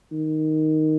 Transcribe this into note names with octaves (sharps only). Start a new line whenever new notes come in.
D#3